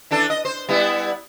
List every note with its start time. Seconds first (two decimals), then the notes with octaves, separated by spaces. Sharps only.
0.11 E3 D4 A4
0.30 D#5
0.45 C5
0.69 G3 B3 E4